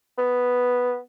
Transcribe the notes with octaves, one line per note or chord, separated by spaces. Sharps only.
B3